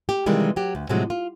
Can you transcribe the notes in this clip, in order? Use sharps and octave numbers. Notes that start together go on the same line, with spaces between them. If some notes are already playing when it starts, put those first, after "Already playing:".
G4
C3 D#3 E3 G3 G#3 A#3
F#3 G4
D2
A2 C3 F3 F#3 G#3
F4